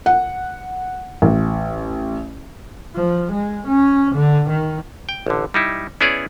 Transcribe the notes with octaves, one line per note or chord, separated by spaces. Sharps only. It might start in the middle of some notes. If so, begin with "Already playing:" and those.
F#5
A1
F3
G#3
C#4
D3
D#3
G5
A1 D3
G3 D#4 E4
B3 C#4 E4 G#4 C#5 D5